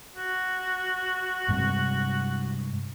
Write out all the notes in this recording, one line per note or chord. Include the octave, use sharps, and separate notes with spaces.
F#4
G2 C3 G#3